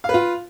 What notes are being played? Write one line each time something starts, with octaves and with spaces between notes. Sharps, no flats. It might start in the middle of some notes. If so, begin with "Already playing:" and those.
F4 B4 F5